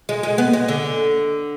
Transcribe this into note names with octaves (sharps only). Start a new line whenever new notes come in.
G#3
G#3
B3
G#3
D3